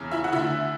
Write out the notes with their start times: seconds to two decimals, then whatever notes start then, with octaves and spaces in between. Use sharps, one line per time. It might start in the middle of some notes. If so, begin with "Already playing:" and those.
Already playing: E2 C#3 E3
0.11 E4 E5
0.24 F#5
0.32 D2 D3 E4 E5